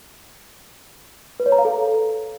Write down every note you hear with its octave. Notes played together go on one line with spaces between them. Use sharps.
B4
C#5
A#5
F5
A4